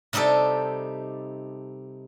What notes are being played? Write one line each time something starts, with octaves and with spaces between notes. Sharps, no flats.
C3 G3 D#4 G4 A4